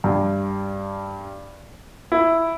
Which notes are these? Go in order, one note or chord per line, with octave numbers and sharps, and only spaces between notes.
G2
E4